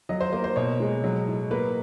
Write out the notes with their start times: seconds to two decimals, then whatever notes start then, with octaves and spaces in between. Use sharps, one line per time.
0.09 F#3 D#5
0.21 C5
0.33 A#3 C5
0.44 C5
0.56 B2 C#5
0.80 G#3
1.04 F#3
1.27 A2
1.51 A#3 B4